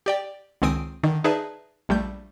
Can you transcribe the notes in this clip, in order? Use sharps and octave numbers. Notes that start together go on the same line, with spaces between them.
G4 D5 G5
C#2 D#3 C4 G#5 D#6 D7
D3 D#3
D#4 G#4 B4 D5 E5 A5
A#1 G3 A3 G6